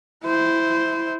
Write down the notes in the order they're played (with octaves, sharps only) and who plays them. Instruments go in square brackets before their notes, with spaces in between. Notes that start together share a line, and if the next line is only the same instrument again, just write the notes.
[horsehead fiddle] E4 C5